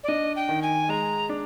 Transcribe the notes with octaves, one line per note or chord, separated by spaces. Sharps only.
D5
D4 D#5
G5
D#3
G#5
G#3 A#5
D4